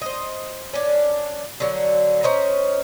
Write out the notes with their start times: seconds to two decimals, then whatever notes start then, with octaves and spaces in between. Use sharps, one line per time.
0.02 C5 D#5
0.73 C#4 D4
1.60 D3 F#3
2.23 C#4 C5 D#5 A#5